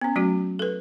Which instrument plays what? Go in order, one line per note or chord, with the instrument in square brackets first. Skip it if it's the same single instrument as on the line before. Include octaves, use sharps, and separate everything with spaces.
[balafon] B3 C#4
F#3 A3 C#4 F#4
A4 B4